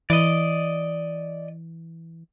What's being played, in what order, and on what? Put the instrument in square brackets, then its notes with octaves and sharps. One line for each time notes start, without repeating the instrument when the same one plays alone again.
[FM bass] E3 [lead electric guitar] D5 D#5